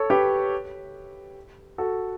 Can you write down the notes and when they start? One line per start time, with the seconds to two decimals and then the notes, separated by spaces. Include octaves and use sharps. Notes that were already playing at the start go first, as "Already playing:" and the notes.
Already playing: A4 C#5
0.10 G4 B4
1.78 F#4 A4